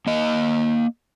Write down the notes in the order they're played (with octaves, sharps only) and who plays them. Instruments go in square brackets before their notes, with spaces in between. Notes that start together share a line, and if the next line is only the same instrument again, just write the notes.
[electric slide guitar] A#3 D#5